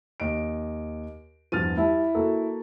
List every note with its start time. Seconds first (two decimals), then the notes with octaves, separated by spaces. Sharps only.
0.20 D#2 D#5 D7
1.52 E2 G2 F3 F6 A6 D#7
1.77 G3 E4 A5
2.15 A#3 F#4 A4